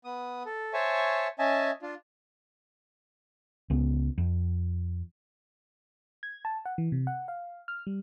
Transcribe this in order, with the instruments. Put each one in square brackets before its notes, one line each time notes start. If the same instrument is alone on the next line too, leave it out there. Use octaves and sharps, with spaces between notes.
[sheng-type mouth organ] B3 D#6
A4
C5 C#5 E5 G#5 A5 C#6
C#4 D#5 E5 G#5 A5
D4 F4
[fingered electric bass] C#2 B3
F2
[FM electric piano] G#6
A5
F#5
E3
C3
F#5
F5
F6
G3